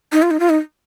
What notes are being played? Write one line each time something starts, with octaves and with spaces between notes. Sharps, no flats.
D#4
F4
D#4
F4
D#4